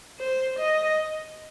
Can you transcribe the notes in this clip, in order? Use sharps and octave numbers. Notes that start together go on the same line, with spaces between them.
C5
D#5